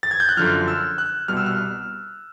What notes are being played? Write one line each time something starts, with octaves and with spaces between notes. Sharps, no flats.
A6
G#6
G6
F#6
F#2 D3 F3 F6
E6
F#6
C2 B2 G3 F6
E6
F6